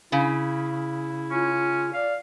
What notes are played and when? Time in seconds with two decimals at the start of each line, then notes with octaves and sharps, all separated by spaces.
0.12 C#3 E4
1.31 C#4 F4
1.93 D5 F5